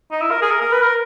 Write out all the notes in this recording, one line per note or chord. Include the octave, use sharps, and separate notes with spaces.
D#4
E4
A#4
G#4
A#4
A#4
B4
A#4